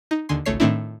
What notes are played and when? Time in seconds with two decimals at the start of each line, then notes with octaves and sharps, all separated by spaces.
0.11 D#4
0.29 D#2 D3 G#5 C6
0.46 G#1 C#2 A3 C#5 C7
0.60 A2 D#3 A3 C4 D4 E4